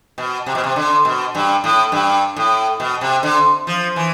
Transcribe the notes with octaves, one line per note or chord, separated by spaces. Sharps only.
B2
C3
B2
C3
D3
B2
G2
A2
G2
A2
B2
C3
D3
F3
E3